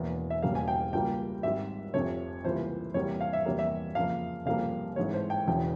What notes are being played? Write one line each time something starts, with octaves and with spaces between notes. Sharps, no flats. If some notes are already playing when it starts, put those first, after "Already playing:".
Already playing: E1 E2 E3 A#3
E5
E1 E2 C#3 G3 A#3 F5
G#5
G5
C#2 C#3 G3 A#3 G5
G#1 G#2 G3 E5
F1 F2 C3 F3 C#5
C#2 C3 E3 G3 A#3 C5
E2 C3 G3 A#3 C#5
F5
E5
E2 C3 G3 A#3 C#5
E5
F2 C#3 F3 A#3 F5
F1 F2 C#3 G3 A#3 F5
G#1 G#2 E3 G#3 C#5
C5
G5
E1 E2 C#3 E3 G5